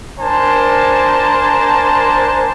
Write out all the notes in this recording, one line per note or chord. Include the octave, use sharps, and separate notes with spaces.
D4 A#4 C5 G#5 A5